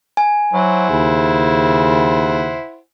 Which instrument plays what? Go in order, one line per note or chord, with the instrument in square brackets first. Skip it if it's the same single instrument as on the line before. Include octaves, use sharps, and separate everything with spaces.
[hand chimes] G#5
[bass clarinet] F#3 [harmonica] E4 C5 F#5
[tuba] D#2 [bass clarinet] C#3